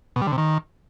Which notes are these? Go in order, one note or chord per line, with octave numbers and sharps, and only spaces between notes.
B2
G3
D3
C3
D#3